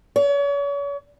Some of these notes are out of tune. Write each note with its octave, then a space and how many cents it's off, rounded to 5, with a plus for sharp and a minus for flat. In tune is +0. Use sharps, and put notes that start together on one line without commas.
C#5 +40